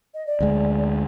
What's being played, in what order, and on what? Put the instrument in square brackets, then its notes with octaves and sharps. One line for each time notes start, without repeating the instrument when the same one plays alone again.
[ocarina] D#5
D5
[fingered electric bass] D2 G#3